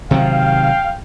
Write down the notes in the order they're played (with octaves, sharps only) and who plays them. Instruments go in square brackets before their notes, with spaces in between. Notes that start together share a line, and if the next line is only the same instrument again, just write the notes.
[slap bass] C3 D#3 F#3 [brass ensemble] F5 G5